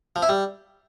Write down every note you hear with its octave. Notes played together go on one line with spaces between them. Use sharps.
F3
E4
G3